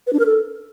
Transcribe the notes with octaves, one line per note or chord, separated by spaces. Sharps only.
B4
D4
A#4
A4